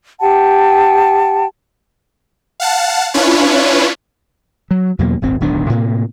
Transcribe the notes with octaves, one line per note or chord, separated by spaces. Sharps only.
G4 F#5 G5 A5
F5 F#5 A5
C#4 D4 E4 F4 B4 C#5
F#3
E2 B2 F#3 A#3
D#1 G#1 C4
D1 B1 D#3 D4
A2 C3 A#3